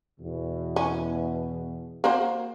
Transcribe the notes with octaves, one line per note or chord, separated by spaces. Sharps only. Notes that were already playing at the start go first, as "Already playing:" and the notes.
E2 B2
C#4
A#3 F#4 C5